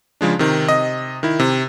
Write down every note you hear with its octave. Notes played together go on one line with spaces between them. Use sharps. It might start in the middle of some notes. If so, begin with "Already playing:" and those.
C#3 F3 G#3 D4
C3 D#3
C3 D#5
D#3 E4
C3